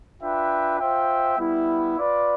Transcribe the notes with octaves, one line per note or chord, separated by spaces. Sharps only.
D4 F4 B4 E5 G5
F4 C5 E5 G5
G3 B3 E4
F4 B4 D5